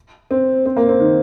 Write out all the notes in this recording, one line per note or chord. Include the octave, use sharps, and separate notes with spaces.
C4
C4
A#3
C4
D#3